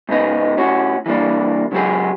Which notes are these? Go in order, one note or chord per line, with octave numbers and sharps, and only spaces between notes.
G#2 C#3 B3 D#4
A2 C#4 F#4
E3 G3 A#3 D4
C#3 F#3 G#3 G4 G#4